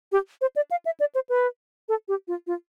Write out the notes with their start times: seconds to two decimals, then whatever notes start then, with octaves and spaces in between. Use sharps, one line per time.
0.12 G4
0.41 C5
0.56 D5
0.71 F5
0.85 E5
1.00 D5
1.15 C5
1.29 B4
1.89 A4
2.08 G4
2.28 F4
2.47 F4